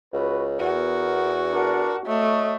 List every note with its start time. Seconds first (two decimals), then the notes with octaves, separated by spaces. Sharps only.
0.13 C#2 F#4 B4
0.60 E2 B3 F#4 A#4
1.52 D4 A#4
2.07 A3 C#5 D#5